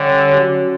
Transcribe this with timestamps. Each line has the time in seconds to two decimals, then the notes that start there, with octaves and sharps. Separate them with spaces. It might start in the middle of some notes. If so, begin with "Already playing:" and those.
Already playing: D3 G3 C#4 G4 C#5
0.36 F#3 C#4 F#4